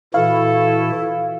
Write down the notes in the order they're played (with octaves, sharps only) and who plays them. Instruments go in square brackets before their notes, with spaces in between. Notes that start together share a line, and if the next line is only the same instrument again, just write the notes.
[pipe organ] A#2 E3 F#4 [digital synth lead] E4 [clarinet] A4 [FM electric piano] F5